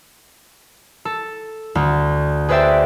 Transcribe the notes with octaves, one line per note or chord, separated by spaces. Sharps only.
A4
D2
G#4 B4 C5 D5 E5 G5